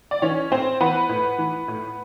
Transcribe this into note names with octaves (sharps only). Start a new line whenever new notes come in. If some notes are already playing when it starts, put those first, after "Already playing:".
D5
E3 C#4 C#5
A2 C4 C5
E3 B3 B4
A2
E3
A2